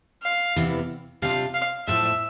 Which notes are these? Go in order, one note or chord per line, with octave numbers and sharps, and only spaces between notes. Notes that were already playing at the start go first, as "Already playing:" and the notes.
F5
E2 C3 E3 B3
C3 G3 D4 F4 F5
F5
A2 F3 A3 E5